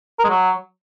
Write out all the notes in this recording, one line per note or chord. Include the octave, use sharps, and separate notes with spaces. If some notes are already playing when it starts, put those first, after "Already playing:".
A#4
G#3
F#3